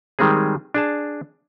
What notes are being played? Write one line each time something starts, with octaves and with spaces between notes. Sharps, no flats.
D#3 G3 G#3 C4 G#4
D4 G#4 A5